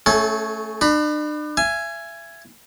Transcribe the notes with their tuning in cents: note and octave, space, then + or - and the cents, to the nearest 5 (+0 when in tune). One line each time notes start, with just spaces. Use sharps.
A3 +0 C#4 +0 A4 -40
D4 +40 B5 +0
E5 +40 G#5 +0